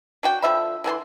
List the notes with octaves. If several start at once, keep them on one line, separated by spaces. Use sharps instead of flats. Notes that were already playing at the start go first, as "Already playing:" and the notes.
D4 F#4 G5
D3 F3 E5 B5
D3 E3 G#5 C6